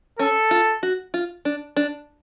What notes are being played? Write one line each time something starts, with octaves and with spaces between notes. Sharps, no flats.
C#4 A4
F4
F#4
F4
D4
D4